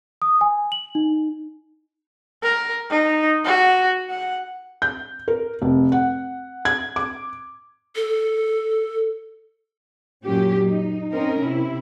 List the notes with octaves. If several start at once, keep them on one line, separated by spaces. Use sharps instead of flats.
D#6
G#5
F#7
D#4
A#4
D#4
F#4
F#5
G6
A#4
F1
F#5
G#6
D6
A4
F#2 A#2 F#3 C#4 G4
D#4
C4 C#4 D#4 A#4
C3 E4